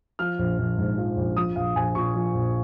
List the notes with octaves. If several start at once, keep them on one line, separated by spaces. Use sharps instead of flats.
F3 F6
A#1
A#1
G#2
F3
A#1
F3 D#6
A#1 F5
A#1 G#5
A#2 C#6
F3
A#1